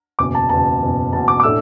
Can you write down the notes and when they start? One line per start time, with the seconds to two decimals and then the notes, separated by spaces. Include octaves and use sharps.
0.19 F#1 E2 B2 D6
0.35 A5
0.49 F#1 E2 B2 A5
0.81 F#1 E2 B2
1.12 F#1 E2 B2 A5
1.28 D6
1.40 D6
1.43 A2 A3 D4 E6